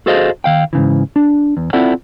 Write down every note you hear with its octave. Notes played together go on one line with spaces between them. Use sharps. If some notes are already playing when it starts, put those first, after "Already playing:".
F#4 G#4 A4 C5 D#5 F5
D#3 F5 G5
G#2 C#3 E3
D4
E2
C4 E4 F4 A4 D5 F#5